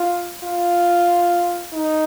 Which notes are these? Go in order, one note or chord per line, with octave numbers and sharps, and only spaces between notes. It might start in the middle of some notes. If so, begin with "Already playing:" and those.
Already playing: F4
F4
D#4